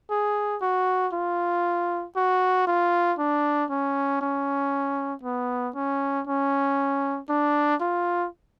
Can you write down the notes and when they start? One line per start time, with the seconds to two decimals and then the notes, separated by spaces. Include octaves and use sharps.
0.10 G#4
0.62 F#4
1.13 F4
2.16 F#4
2.67 F4
3.18 D4
3.70 C#4
4.21 C#4
5.23 B3
5.75 C#4
6.27 C#4
7.29 D4
7.81 F4